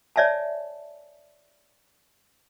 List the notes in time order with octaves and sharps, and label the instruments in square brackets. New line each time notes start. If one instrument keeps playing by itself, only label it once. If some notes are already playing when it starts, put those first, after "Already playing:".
[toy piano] C#5 D5 E5 G#5 A5